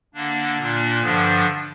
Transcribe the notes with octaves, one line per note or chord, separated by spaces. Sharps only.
D3 A#3 D4
A#2 A#3 D4
G2 D3 F3 D4